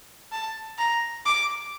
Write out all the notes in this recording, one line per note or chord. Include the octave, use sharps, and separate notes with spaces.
A5
A#5
D6